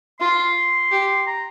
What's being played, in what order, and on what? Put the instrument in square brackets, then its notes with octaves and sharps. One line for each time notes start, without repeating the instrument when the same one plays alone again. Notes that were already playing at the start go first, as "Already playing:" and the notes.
[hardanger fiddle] F4 [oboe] C6
[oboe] C6
[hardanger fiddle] G4
[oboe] A#5